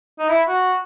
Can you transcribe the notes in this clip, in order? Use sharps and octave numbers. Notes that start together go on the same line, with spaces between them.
D#4
E4
F#4